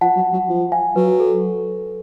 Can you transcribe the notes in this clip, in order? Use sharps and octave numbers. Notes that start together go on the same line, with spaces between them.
F3 F#5 A5
F#3
F#3
F3
F5 G#5
F#3 B4
A4